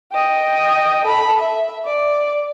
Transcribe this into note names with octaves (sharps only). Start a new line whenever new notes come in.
D#5 G5
A4 B5
E5
D5